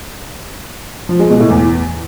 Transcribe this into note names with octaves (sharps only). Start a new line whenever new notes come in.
F3
G#3
B2
A2
E2